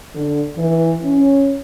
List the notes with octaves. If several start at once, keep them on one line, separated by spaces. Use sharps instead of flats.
D3
E3
C#4